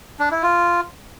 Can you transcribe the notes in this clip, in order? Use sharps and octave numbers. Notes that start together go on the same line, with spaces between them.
D4
E4
F4